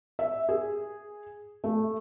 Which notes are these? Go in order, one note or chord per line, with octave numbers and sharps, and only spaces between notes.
E5
G#4
A3